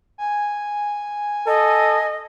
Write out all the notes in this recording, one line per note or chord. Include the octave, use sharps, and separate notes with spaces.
G#5
A4 D#5